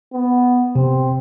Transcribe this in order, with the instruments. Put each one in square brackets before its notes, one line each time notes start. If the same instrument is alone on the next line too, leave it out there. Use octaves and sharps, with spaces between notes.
[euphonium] B3
[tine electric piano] C3 [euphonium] C4